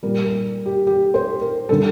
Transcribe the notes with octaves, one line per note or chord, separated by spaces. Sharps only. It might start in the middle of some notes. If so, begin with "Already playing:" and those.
A#2 G3 A#4
A#4
G4
G4
C5
A#4
D3 G3 A4